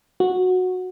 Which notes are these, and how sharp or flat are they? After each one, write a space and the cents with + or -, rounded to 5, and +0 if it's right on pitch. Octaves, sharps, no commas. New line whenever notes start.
F#4 -10